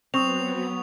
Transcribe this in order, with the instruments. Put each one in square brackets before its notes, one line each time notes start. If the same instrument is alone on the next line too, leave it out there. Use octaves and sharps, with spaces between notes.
[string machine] F#3 B3 [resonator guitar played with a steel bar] C4 [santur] C#6 [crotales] D#6 F7